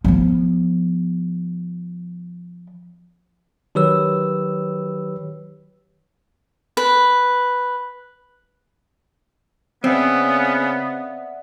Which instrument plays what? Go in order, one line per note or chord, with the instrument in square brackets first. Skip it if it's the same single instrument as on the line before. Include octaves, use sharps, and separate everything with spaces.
[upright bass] F3 B3
[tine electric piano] D#3 F#3 G4 B4 C#5 E6
[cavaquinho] B4
[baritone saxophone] C#3 [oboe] B3 [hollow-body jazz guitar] C4 [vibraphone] D5 E5 F#5